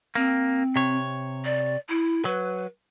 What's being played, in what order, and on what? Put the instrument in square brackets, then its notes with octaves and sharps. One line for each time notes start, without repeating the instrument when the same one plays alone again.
[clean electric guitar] A#3 [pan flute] C4
[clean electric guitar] C3 C#5
[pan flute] D5
E4
[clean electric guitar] F#3 [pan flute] B4